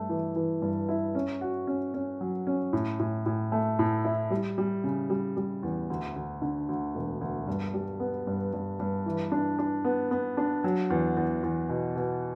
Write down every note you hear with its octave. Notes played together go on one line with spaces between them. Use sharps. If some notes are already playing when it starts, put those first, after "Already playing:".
Already playing: G2 A3
E3
E3
G2
E4
C#4
F#4
C#4
C#4
F#3
C#4
A2
A2
A2
A3
A2
E4
G3
G3
C#3
G3
G3
E2
D2
D2
D3
D2
E1
D2
G2
G3
B3
G2
G2
G2
E3
D4
D4
B3
B3
D4
F#3
E2
E2
E2
B2
B2